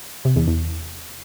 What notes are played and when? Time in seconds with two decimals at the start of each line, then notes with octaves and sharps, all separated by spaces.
0.25 C3
0.36 E2
0.47 E2